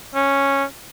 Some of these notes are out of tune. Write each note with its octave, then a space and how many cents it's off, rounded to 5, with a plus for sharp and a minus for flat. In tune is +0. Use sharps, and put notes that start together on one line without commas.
C#4 -5